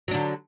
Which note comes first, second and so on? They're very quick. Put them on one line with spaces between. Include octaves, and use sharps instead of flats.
F#3 D4 D3